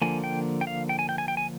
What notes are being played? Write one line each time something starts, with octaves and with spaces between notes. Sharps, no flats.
D3 F3 A#3 G#5
G5
G5
F5
G5
G#5
G5
G#5
G5
G#5